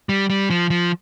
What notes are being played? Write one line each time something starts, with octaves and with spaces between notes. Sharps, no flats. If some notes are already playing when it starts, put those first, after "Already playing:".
G3
G3
F3
F3